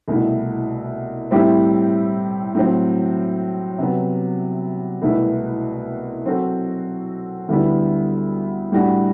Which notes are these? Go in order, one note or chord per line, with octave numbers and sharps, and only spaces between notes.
C2 B2 A3 E4
A2 G3 C4 E4 G4
A2 F#3 C4
C3 F#3 B3
C2 B2 A3 E4 B4
F#3 C4 F#4 A4 C5
D2 D3 G3 B3 E4
A2 G3 D4 F#4